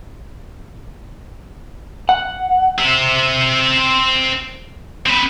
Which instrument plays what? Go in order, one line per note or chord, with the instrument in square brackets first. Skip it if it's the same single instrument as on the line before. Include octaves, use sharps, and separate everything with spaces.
[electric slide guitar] F#5
[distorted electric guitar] C4 E5
C4 B4